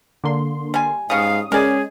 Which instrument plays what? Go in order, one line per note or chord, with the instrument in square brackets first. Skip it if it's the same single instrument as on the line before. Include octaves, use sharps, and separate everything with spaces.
[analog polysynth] D3 A#3 C6
[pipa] G3 G#5
[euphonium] G#2 [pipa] G3 C#4 [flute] F5 [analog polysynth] D#6
[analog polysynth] G#3 [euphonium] C#4 [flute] G#4 [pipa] A#4 D5